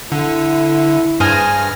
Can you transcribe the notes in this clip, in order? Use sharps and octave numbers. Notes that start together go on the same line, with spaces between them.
D3 E4
G2 G#4 C5 G#5 F6 A#6